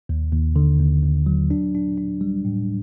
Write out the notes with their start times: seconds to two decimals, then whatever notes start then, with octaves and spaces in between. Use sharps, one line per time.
0.09 D#2
0.33 D#2
0.56 D3
0.80 D#2
1.03 D#2
1.26 F#3
1.51 D4
1.75 D4
1.98 D4
2.21 G3
2.45 A2